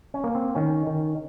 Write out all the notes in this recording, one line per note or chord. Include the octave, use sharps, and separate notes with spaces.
C#4
A#3
C4
D#3 C#4
D#3